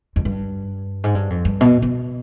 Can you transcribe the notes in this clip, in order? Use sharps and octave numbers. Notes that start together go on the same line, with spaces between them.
F2
G2
G#2
G2
F2
G2
B2
B2